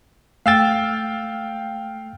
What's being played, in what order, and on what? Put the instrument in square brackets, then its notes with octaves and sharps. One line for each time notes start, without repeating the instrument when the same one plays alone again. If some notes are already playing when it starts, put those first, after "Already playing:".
[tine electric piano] A3 E6 A6 [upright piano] F5 G5